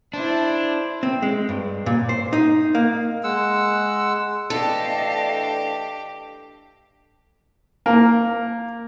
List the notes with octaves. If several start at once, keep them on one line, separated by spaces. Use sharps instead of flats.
D4 E4 C5
C4
G#3
G2
A#2
C5
D#4
A#3
G#3 F#5 E6
E3 A3 D4 G4 A4 D#5 F5 A5
A#3